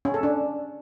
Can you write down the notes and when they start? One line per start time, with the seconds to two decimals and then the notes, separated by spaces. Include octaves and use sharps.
0.05 C#4
0.14 A4
0.23 D4